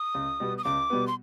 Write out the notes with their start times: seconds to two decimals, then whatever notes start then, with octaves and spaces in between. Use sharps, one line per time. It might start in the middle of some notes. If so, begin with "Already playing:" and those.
Already playing: D#6
0.14 C#2
0.40 B2 G3 B3
0.58 D#6
0.64 C#2 D6
0.90 B2 G3 B3
1.07 C6